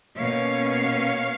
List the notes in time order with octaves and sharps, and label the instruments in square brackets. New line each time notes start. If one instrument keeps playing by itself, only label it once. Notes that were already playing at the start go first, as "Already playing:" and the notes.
[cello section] B2 A#3 C#4 C#5 F5